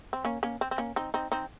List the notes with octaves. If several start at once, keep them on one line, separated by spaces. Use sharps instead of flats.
C4
A#3 C#4
A#3 C#4
C4
C4
A#3 C#4
C4 D#4
C4 D#4
C4 D#4